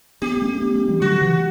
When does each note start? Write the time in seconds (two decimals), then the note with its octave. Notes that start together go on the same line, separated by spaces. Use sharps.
0.22 B3 D4 G4
0.37 B3
0.42 A3 C#4
0.62 B3 D4
0.75 A3 C#4
0.88 E3 G3
1.01 D3 F#3 F#4
1.21 C#3 E3